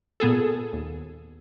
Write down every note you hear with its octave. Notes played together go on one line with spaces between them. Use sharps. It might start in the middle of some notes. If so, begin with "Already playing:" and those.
A#2 B3 G#4 A4
D#2